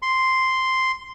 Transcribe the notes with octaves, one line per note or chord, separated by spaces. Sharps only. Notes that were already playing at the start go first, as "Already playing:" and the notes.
C6